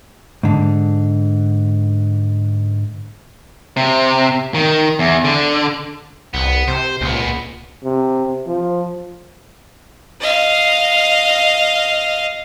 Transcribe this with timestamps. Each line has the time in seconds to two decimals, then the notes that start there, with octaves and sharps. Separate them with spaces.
0.43 G#2 D3
3.77 C3
4.54 D#3
4.99 E2
5.24 D3
6.34 C2 B3
6.68 C3 C5
7.01 C#2 A#2 B3
7.84 C3
8.47 F3
10.20 D#5 F5